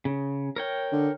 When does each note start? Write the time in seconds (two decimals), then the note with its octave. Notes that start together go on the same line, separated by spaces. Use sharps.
0.05 C#3
0.56 A#4 C#5 G5
0.92 D3